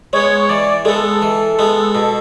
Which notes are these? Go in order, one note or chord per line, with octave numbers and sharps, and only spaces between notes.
G#3 B3 C#5
C#5
E3 D5
G#3 B3 A4
E3
G#3 B3
B2